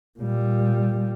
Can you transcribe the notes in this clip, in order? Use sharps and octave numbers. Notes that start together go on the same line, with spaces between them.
A#2 G3